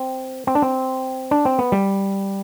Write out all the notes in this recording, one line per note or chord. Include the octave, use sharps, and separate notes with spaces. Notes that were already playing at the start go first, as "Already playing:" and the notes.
Already playing: C4
C4
D4
C4
D4
C4
B3
G3